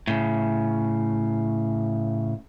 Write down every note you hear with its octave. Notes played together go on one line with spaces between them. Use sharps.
A2 C#3